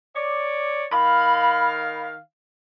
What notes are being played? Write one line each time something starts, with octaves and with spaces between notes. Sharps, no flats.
C#5 D5
D#3 F5 B5